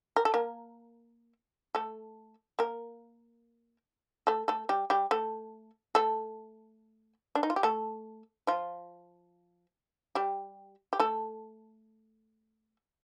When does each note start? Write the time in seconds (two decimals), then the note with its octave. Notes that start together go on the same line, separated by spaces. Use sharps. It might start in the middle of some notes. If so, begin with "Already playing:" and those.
0.16 A#4
0.25 A4
0.34 A#3 A#4
1.75 A3 A4
2.59 A#3 A#4
4.27 A3 A4
4.48 A3 A4
4.69 G3 G4
4.90 G3 G4
5.11 A3 A4
5.95 A3 A4
7.35 D4
7.43 D#4
7.50 F4
7.56 G4
7.63 A3 A4
8.47 F3 F4
10.15 G3 G4
10.93 G4
11.00 A3 A4